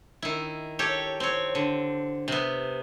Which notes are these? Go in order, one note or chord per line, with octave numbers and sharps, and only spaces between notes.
D#3 E4
G4 A4 C#5
C4 C#5
D3
C3 B3